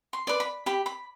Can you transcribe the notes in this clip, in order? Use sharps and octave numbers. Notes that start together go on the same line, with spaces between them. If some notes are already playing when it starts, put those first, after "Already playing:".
C6
B4 D5
B5
G4 B5
B5